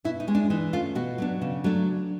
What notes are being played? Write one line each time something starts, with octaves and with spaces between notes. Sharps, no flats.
B2 E4
D#4
G#3 C#4
D4
E3 D#4
A3 C#4 F4
B2 F#4
F#3 B3 D4
C#3
F#3 A3 D4